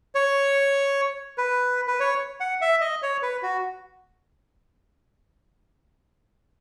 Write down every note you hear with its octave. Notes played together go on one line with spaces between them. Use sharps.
C#5
B4
B4
C#5
F#5
E5
D#5
C#5
B4
F#4